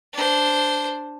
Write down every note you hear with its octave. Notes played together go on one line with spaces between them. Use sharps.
D4 C5